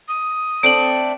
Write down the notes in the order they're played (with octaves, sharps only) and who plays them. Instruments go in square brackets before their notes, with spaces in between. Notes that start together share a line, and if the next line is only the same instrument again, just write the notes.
[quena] D#6
[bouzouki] A3 C4 D4 [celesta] D7 F#7